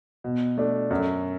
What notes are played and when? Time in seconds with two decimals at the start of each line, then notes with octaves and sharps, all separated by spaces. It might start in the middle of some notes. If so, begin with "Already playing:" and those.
0.24 B2
0.58 A3 D4
0.91 F#2